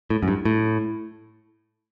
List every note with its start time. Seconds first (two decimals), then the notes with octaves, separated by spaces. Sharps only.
0.10 A2
0.23 F#2
0.28 G2
0.45 A2